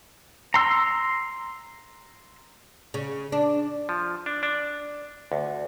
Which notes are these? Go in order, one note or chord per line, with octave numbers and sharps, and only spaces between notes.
A#5 C6 E6
C#3
D4
F3
D4
D4
D2